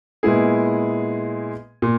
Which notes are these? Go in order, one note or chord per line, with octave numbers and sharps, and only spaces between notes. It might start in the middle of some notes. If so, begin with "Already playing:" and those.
A#2 G#3 B3 E4 G#4
A#2